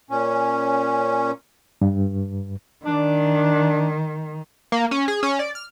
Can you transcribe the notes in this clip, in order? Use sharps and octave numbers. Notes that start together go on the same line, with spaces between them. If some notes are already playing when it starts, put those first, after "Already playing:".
A#2 C#4
G2
D#3 D4
A#3
C#4
G#4
C#4
D5
F6